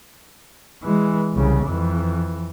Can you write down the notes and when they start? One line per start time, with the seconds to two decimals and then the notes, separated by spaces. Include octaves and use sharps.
0.83 E3 G#3
1.34 C2 C#3
1.66 F2 E3